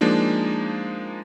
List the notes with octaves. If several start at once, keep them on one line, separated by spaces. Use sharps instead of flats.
F3 G#3 A#3 D4 D#4